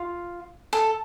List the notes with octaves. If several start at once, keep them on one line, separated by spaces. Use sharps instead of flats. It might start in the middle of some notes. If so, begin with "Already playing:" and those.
Already playing: F4
A4